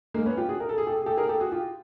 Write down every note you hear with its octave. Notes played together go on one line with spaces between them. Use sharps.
G#3 A#3
B3 C#4
F4 G4
F#4 G#4
A#4
A4
G#4
G4 A4
G#4
G4 A4
G#4 A#4
G4 A4
F#4 G#4
F4 G4